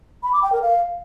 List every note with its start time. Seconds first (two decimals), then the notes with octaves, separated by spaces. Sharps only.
0.23 B5
0.33 D6
0.43 G5
0.53 A#4
0.62 F5